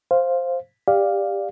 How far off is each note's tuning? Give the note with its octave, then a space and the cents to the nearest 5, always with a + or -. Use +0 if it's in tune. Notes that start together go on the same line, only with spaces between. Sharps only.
C5 +5 F5 +0
G4 +20 D5 +0 F5 +5